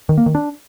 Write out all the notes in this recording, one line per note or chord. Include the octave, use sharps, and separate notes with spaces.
D#3
A#3
D#3
D4